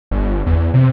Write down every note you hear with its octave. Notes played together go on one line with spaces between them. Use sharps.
G1
E2
C3